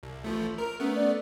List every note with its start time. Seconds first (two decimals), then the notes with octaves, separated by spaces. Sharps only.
0.03 C2
0.24 A1 F3 A3
0.58 A#4
0.80 A3 B3 C#4
0.95 D5